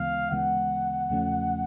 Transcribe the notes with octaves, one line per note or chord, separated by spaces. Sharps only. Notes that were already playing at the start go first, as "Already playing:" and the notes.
Already playing: D2 C#3 E3 G#3 B3 F5
D2 C#3 E3 G#3 B3 F#5
E2 C#3 F3 A3 C#4